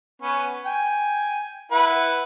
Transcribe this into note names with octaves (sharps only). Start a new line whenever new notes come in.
B3 C#4
G5 G#5
E4 B4 F#5